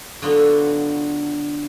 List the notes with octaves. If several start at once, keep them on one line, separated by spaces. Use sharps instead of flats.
D3 F#3 B3 F4